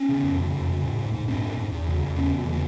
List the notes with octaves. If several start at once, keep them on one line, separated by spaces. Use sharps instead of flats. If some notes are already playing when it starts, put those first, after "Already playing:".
Already playing: B3 C#4
C#3
F2
C#3
F2
C#3
G#2
G#2
G#2
G#2 C4 D4
G#2
G#2
E2
C#3
E2
C#3 B3 C#4
E2
C#3
B3